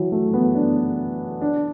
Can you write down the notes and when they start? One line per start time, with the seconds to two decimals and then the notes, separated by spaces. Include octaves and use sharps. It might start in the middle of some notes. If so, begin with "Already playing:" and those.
Already playing: E3 F#3
0.12 A3
0.33 B3
0.55 D4
1.41 D4